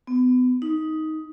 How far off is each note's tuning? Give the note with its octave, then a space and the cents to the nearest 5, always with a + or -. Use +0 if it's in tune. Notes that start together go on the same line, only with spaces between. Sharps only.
B3 +30
D#4 +10